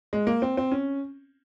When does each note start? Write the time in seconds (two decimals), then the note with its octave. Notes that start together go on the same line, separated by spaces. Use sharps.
0.13 G#3
0.27 A#3
0.42 C4
0.57 C4
0.72 C#4